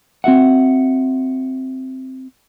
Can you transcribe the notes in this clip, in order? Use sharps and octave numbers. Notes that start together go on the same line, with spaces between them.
C4 F#4 E5 F#5